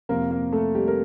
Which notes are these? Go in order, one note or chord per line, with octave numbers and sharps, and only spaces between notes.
F2 C3 F3 A#3 A#4
A#3 A#4
A3 A4
G3 G4
A#4